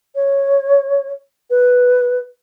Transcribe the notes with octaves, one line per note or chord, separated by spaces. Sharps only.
C#5
B4